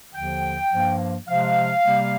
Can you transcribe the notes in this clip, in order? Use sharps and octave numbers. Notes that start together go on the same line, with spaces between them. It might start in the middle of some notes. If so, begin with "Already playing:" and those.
D#2 D3 F3 G5
G2 F3 A#3
C3 F3 G#3 F5
C3 G3 A#3